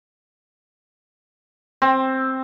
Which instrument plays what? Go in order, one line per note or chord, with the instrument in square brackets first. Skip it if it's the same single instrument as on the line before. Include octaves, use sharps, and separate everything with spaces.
[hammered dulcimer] C4